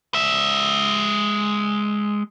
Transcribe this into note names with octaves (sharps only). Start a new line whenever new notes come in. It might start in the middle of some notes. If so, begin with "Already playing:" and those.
G#3 E5